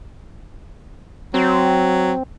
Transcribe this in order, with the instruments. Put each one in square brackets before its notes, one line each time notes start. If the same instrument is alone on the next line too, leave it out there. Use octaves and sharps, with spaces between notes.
[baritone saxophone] F#3 [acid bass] C4